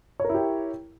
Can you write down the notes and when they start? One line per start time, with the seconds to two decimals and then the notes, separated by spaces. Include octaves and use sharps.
0.20 C#5
0.25 A#4
0.29 E4
0.34 G4